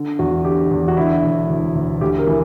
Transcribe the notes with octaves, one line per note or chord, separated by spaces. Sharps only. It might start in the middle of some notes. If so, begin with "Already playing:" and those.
Already playing: D3
E2 F#4
D3 G4
E2
F#4
D3 E4
E1
D2
D2
D2 G4
A#4
E3